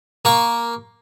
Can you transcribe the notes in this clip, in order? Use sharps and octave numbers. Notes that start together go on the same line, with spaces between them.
A#3 C#6